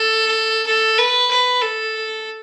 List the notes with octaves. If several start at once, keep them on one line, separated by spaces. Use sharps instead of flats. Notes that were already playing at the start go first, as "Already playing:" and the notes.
Already playing: A4
A4
B4
B4
A4